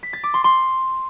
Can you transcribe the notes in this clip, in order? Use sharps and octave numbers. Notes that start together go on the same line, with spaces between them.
B6
A6
D6
C6
C6